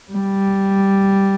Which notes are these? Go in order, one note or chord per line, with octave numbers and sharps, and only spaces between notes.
G3